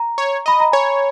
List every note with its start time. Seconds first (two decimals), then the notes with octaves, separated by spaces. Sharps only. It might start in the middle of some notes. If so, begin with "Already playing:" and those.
Already playing: A#5
0.18 C#5
0.46 D#5 B5
0.60 A#5
0.72 C#5 G#5